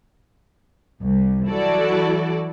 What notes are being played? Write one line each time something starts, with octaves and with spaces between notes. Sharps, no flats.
C2
E3 F#3 E4 F#4 A4 D5